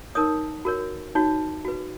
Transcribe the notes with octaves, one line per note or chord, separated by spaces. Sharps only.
D#4 A#4 C#5 D#6
F#4 A#4 C#5
D#4 F#4 C#5
F#4 B4